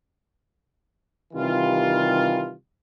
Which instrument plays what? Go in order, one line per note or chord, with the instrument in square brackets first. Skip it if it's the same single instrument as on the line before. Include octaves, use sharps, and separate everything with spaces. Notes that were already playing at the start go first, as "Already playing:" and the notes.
[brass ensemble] C3 D#3 E3 G3 F4